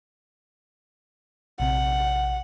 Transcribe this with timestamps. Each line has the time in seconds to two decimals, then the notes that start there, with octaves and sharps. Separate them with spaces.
1.60 A#1 C3 F#5